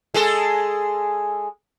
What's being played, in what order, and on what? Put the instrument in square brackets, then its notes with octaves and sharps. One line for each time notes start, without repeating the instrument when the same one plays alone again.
[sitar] G#3 G#4 A4